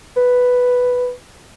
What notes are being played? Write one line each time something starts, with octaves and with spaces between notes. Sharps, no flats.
B4